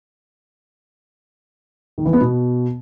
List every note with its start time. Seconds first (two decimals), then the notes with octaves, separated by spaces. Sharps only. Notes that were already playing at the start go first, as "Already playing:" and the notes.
1.98 D#3
2.05 E3
2.13 B3
2.21 B2